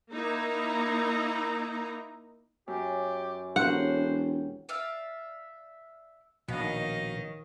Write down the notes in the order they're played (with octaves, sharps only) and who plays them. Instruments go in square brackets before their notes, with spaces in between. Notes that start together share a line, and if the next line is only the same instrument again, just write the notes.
[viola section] A#3 D#4 E4 A#5
[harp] F#2 [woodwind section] G4
[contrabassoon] E1 [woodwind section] A2 D4 C5 [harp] C#4 G4 A#4 [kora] F#5
[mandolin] D5 E5 F5
[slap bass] A#1 [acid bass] B2 [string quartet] D#3 D#5 F5 [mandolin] C#5